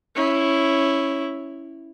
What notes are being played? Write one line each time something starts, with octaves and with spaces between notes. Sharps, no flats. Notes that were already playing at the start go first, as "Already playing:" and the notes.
C#4 E4